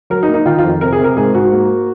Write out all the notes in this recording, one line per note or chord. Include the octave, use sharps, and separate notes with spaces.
F#3 A#4
D#4
A#3
D#4
D#3 F4
F4
F2
C3 A#4
G#4
C3
A#4
G#2 G#4
G#2 F#4
A#3